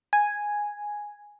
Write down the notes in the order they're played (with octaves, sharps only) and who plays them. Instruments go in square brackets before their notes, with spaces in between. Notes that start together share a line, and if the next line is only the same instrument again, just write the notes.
[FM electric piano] G#5